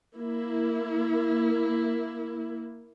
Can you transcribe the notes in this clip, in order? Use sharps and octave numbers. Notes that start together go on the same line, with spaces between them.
A#3 E4